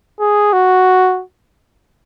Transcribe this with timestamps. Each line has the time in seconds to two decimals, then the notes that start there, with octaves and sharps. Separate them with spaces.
0.20 G#4
0.53 F#4